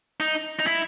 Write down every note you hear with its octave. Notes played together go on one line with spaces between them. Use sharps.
D#4
D#4
E4